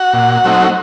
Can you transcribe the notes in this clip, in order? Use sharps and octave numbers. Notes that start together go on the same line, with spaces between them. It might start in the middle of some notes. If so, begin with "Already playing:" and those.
Already playing: F#4 F#5
A#2
F#3 A3 C4 D#4